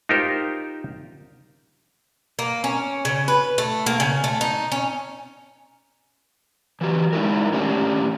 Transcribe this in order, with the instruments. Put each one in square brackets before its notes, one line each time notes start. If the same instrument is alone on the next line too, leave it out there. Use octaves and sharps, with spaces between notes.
[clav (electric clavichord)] D#4 F4 G4 A#4 C5
[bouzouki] A#3
C#4
C#3
B4
A3
A#3
C#3
A3
D#4
C#4
[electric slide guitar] E3 F#4 G4
G#3 D#4 E4 A#4
A2 D#3 C#4 D4 G4 A#5